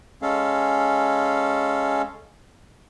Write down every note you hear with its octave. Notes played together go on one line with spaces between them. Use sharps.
G#3 C#4 A4 F5